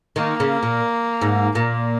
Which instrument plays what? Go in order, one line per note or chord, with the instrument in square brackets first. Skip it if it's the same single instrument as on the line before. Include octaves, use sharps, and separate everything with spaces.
[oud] D#3 [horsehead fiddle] A#3
[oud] C#3
A#2
G#2
[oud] A#2 [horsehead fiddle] A#3